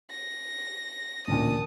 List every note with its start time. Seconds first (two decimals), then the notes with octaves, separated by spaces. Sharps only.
0.10 A#6
1.27 A1 D2 A#2 A5 D#6